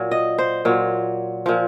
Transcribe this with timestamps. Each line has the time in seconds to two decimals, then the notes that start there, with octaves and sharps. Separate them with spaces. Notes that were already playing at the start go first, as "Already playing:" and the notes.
Already playing: A#2 F#3
0.11 D#5
0.38 C5
0.65 A#2 F#3
1.46 A#2 F3